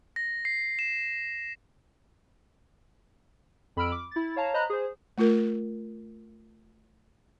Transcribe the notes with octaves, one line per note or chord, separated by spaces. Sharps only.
A#6
C7
E7
F2 B5 E6 F6 D7
D6
E4 A6
C#5 F5 A5 A#5
C5 D#5 A#5 B5 F#6
G#4 C5
A3 F4 A#4